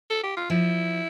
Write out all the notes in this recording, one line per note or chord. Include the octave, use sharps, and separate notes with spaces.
A4
G4
F4
F3 E4